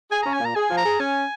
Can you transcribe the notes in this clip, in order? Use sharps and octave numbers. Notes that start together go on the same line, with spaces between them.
G#4 G#5
C#4 A#5
G#5
A#2 A#5
G#4 G#5
F3
A#5
G#4
C#4 G#5